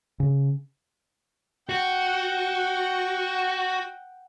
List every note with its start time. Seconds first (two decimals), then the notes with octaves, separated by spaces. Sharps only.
0.20 C#3
1.69 F#4 F#5 G5